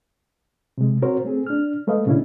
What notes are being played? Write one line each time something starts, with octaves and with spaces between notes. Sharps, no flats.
C3 G#3
C4 F#4 A#4 C5 C#5
A3 C4 G#4
D4 F6
G#3 A3 B4 D#5 F5
A#2 C#3 A#3 C#4 D4 E4